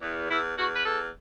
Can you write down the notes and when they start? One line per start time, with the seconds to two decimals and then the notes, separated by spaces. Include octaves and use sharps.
0.01 E2
0.29 E2 E4
0.56 E2 F#4
0.74 B4
0.84 E2 A4